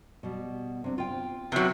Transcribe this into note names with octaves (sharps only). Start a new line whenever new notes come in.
B2 G3
C3 D4
F4 G5
C3 F#3 B3